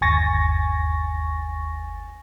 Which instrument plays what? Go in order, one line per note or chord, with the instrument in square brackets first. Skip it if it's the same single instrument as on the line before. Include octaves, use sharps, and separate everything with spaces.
[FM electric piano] G1 D#2 G#5 C#6 A6 A#6